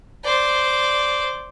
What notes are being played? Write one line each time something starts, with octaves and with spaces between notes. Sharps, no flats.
C5 D5